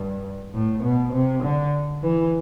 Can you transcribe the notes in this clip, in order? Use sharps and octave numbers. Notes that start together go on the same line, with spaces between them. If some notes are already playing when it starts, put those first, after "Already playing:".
Already playing: G2
A2
B2
C3
D3
E3